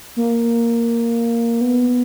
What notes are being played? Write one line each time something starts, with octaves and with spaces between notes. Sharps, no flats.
A#3
B3